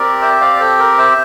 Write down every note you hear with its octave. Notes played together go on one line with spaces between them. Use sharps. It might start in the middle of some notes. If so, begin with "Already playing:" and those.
Already playing: C4 G4 A#4 D5
C5 E5
D5 F5
D5
A4 C5
A#4
C5 E5